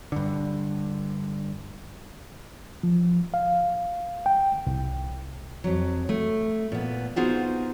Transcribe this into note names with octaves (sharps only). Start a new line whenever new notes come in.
G2 D3
F3
F5
G5
C2
F2 F#3
A3
A#2 B3
B3 D#4 F4 F#4 G#4 C5